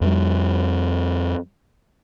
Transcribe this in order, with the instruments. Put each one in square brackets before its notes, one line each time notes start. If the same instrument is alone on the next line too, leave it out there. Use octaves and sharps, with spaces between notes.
[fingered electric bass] F2 G3